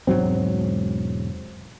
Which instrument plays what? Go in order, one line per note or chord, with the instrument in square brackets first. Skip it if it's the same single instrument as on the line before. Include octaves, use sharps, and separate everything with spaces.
[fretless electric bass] E1 G#2 F#3 C4